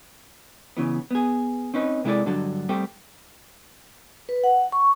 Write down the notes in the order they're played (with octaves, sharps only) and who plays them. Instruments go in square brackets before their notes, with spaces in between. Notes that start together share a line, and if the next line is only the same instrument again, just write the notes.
[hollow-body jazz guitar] C#3 E3 B3
B3 G#4
C4 C#4 D#4 B4
C3 G#3 E4 A4 D5
G2 D3 F#3 A4
G3 A3 C4 G4
[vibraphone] B4
F#5
C#6